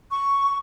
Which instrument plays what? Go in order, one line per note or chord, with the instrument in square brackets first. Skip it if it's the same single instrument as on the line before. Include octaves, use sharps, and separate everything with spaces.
[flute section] C#6